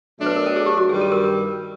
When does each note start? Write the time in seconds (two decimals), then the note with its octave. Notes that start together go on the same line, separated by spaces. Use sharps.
0.20 B2 F#3 A3 D4
0.26 B4
0.36 A#4
0.46 A4
0.56 G#4
0.66 G4
0.78 F#4
0.89 G2 D#3 G3 G#4
1.01 A4
1.12 A#4
1.24 A#4